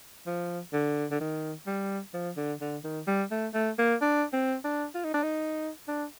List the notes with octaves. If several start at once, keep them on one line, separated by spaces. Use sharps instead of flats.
F3
D3
D3
D#3
G3
F3
D3
D3
D#3
G3
A3
A3
A#3
D4
C4
D4
F4
D#4
D4
D#4
D4